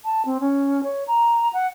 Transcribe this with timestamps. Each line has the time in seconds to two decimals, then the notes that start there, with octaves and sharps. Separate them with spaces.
0.05 A5
0.25 C4
0.40 C#4
0.83 C#5
1.08 A#5
1.53 F#5